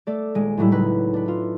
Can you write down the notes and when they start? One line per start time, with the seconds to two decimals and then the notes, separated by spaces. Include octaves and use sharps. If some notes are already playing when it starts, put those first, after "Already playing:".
0.07 A3 A4 D5
0.35 D#1 G#3 D7 D#7
0.57 A2 F#3 G3 E4
0.71 C#2 F#3 D#4 B4
1.14 D4 B4
1.26 E4 F4